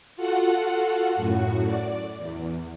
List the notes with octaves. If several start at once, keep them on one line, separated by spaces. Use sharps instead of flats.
F4 F#4 A4 F#5
F#2 A2 F#4
D5
E2